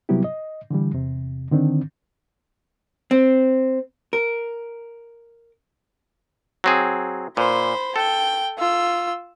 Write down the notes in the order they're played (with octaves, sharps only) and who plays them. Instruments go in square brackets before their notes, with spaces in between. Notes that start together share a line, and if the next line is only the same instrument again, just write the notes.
[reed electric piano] C3 F#3 G3 B3 E4 G4
D#5
D3 E3 G3
E2 C3
D3 D#3 C4 D4
[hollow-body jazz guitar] C4
A#4
[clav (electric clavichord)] F#3 C4 G#4
[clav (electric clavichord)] A#2 [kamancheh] C5 B5
[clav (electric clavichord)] A4 [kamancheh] G5
[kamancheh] F4 E6